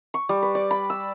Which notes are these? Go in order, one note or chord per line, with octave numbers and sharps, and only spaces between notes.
C#6
G3
B4
D5
B5
E6